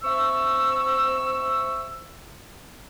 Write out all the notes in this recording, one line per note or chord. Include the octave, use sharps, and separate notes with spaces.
C4 E5 C#6 E6